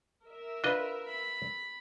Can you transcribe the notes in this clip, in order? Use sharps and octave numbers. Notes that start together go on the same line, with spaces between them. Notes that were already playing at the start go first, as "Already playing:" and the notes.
A#4 E5
D4 F4 B4 D#5
B5